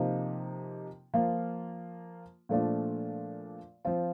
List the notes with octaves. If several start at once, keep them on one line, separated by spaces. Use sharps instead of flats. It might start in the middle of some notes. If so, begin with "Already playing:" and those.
Already playing: C3 F3 A#3 D#4
F3 A#3 F4
A#2 F3 A3 D4 F4
F3 C4 F4